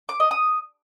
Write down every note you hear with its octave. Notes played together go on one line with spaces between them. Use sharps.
D6
D#5
D#6